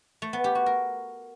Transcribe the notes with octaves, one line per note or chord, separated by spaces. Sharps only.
A3
B3
G4
F#4
A#4